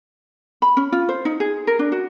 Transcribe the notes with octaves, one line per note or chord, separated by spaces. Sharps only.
B5
C#4
F4
C5
D#4
G#4
A#4
D4
F#4